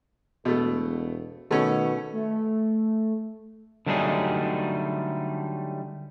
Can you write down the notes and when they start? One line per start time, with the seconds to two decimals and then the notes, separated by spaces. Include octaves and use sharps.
0.45 E1 B2 A3
1.51 B2 D#3 A3 C#4
2.12 A3
3.86 D3 F#3 G3 A3 D#4 G#4